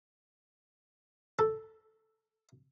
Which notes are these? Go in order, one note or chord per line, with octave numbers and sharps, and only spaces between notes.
A4